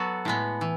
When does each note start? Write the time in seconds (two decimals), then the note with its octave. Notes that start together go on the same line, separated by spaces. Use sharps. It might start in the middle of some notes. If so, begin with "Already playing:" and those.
Already playing: F#3 B3 F#4 A4
0.25 A2 G#3 B3
0.61 E3